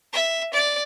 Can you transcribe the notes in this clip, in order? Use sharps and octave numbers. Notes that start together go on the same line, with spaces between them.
E5
D5